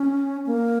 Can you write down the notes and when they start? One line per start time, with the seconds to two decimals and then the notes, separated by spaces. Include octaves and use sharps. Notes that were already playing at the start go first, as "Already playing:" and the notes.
Already playing: C#4
0.47 A#3